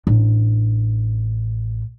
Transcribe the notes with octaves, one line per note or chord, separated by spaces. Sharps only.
A1 D4